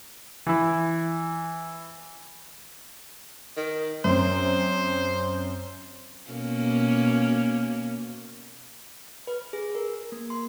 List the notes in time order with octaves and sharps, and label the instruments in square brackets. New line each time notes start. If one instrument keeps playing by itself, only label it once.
[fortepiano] E3 E4
[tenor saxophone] D#3
[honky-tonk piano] F#2 C4 [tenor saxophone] C5
[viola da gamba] B2 A#3 C#4
[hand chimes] B4
G#4
A#4
A#3
C6